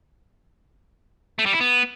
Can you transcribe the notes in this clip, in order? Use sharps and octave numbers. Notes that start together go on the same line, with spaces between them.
A3
G3
E4
B3